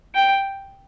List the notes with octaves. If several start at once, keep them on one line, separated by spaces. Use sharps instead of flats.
G5